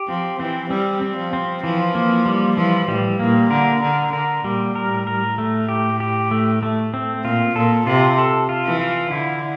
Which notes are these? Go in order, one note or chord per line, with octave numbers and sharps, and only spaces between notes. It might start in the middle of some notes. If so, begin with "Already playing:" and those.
Already playing: G4
F3 C4
E3 C4
G3 C4
C4
F3
C4
E3 F3
A#3
G3
E3 F3
A2 G3
A#2 A#3
D3 A#4
D3 A#4
D3 A#4
A#2 G3
A#4
A2
A#4
A3
G4
G4
A3
A3
C4
A#2 F4
A#2 A4
C3 F4
A4
F4
E3
F4
D3 E4